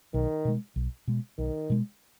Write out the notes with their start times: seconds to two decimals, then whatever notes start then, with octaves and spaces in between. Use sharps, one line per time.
0.14 B1 D#3
0.45 B2 G#3
0.76 B1
1.08 B2 G#3
1.38 B1 D#3
1.70 B2 G#3